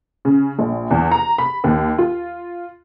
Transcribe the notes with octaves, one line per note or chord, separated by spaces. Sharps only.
C#3
A#1
E2
A#5
B5
D#2
F4